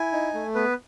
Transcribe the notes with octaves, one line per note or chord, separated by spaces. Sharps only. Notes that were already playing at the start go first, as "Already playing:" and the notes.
Already playing: E4 G#5
D#4
A3
B3 B4